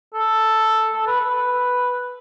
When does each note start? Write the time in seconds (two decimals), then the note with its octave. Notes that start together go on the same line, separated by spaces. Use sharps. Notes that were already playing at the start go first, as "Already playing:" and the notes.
0.14 A4
0.94 A4
1.07 B4
1.21 B4